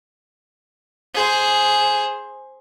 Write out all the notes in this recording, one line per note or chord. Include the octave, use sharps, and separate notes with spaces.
G#4 C5